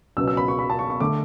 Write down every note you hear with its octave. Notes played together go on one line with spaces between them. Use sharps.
C#2 B2 F#3 B3 E6
E6
B5
C#6
B5
A5
C#6
C#6
D3 A3 D6